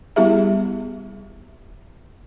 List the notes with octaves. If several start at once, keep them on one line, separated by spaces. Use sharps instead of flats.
G3 B3 E4 G4 G#4 E5